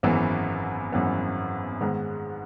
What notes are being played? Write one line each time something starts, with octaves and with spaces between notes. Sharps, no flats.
G#1 F#2 E3 B3
G#1 F#2 E3 B3
G#2 D#3 G#3 B3